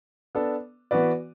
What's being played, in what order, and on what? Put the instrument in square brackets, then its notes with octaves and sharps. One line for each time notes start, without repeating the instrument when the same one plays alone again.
[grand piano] B3 D4 A4
E3 B3 F#4 B4 D5